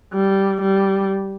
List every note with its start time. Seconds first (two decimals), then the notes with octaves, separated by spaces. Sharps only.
0.13 G3
0.61 G3